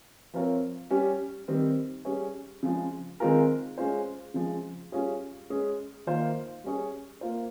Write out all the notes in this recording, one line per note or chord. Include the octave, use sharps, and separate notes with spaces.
F3 C4 F4 A#4 C#5
G3 C#4 G4
D#3 G3 C4
G3 C#4 G#4 C#5
C#3 F3 G#3
D#3 G#3 C4 F4 A#4
G#3 C#4 F4 C5
C#3 F3 G#3
G3 C#4 F4 G#4 C#5
G#3 C#4 G#4
D#3 A#3 F4 C5
G3 C#4 G#4 C#5
A#3 F4 C5